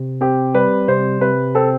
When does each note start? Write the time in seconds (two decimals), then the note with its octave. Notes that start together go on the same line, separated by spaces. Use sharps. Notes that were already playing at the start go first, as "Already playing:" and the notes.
Already playing: C3
0.21 C4 G4
0.54 G3 B4
0.88 C3 C5
1.21 C3 B4
1.55 C4 A4